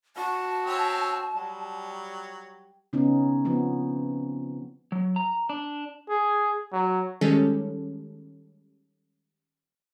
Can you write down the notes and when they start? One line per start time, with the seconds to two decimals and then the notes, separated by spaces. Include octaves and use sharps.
0.16 F#4 A5
0.66 C4 C#4 E5
1.35 F#3 G3
2.93 C#3 B3 C#4 D#4
3.45 F3 B3 C4
4.92 F#3
5.16 A#5
5.49 D4
6.09 G#4
6.72 F#3
7.21 D#3 G3 G#3 C#4 A4